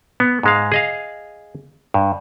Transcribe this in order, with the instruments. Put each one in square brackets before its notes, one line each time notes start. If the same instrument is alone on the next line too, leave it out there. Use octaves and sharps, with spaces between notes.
[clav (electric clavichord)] B3
G#2 G#3 F5
G#4 D#5 F5
G2